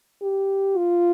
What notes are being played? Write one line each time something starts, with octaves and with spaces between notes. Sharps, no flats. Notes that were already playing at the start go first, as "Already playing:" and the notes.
G4
F4